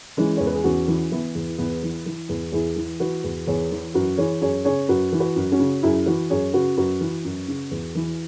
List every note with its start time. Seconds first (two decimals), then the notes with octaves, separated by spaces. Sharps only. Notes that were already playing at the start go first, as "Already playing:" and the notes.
0.17 E3 G#3 C#4
0.37 E2 C#5
0.47 B4
0.55 G#4
0.64 E2 C#4 F#4
0.88 E3
1.12 E3 B3 E4
1.35 E2
1.58 E2 B3 E4
1.83 E3
2.06 E3
2.29 E2
2.52 E2 E4 G#4
2.76 E3
3.00 E3 F#4 B4
3.24 E2
3.47 E2 G#4 C#5
3.71 E3
3.94 F#2 F#4 B4
4.18 E3 G#4 C#5
4.41 F#2 G#4 C#5
4.65 C#3 G#4 C#5
4.88 F#2 F#4 B4
5.12 E3
5.20 F#4 B4
5.36 F#2
5.52 C#4 F#4
5.59 C#3
5.83 F#2 E4 G#4
6.06 E3 F#4 B4
6.30 F#2 G#4 C#5
6.53 C#3 F#4 B4
6.77 F#2 F#4 B4
7.01 E3
7.25 F#2
7.48 C#3
7.71 E2
7.95 E3